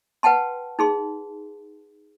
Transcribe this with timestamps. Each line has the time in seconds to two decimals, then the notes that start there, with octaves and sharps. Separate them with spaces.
0.23 B4 F#5 G5 A5 C6
0.79 D#4 G#4 C6